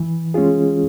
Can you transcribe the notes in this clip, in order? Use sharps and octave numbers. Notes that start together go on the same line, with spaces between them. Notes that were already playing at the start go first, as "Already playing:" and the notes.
Already playing: E3
G#3 C#4 F4 G#4